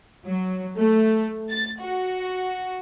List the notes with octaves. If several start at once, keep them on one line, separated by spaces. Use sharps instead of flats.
F#3
A3
A6
F#4